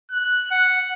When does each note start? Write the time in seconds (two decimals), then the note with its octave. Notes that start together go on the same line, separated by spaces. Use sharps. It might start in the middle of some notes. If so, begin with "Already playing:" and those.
0.11 F#6
0.51 F#5